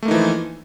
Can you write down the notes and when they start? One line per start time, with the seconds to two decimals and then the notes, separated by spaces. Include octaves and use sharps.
0.03 A3
0.05 A#3
0.08 D#4
0.11 E3
0.14 F3